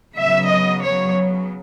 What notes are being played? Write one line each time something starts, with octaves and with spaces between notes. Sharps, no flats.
C#3 F#3 B3 E5
D#5
C#5